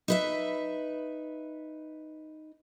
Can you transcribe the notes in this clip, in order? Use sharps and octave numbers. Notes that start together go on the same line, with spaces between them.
D#4 B4 E5